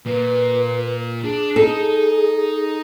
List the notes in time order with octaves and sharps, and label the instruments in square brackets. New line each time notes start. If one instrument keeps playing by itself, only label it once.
[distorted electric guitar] A#2 [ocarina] B4
[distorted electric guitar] D4 [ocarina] G#4
[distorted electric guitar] D#4 [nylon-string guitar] A4